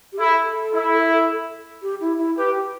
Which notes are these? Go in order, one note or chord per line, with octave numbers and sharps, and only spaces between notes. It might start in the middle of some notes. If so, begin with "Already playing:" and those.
G4
E4 A4
E4
G4
E4
E4
G4 B4
G4